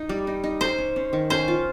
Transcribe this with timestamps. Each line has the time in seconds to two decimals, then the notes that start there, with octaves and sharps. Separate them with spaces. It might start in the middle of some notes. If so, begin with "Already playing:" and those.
Already playing: D#4
0.09 G3
0.27 D#4
0.44 D#4
0.61 C#4 C5
0.78 C#4
0.96 C#4
1.13 D#3
1.30 C#4 C5
1.48 F4